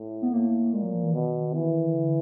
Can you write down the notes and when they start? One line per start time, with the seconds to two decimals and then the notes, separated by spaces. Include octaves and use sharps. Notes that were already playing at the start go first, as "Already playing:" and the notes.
Already playing: A2
0.22 B3
0.33 A2 A#3
0.73 A#2 G#3
0.83 F#3
0.93 F3
1.03 E3
1.13 B2 D#3
1.54 E3
1.86 D#3
1.93 D3